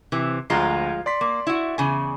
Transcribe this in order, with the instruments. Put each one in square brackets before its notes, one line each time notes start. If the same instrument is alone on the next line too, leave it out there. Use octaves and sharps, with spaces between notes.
[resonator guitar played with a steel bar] C3 E3 C4
[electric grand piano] D2 A#5 C7 [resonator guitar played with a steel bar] F3 G#3 F4
[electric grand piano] D5 C6 B6
[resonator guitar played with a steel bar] A#3
E4 F#4
E2 C#3 G#5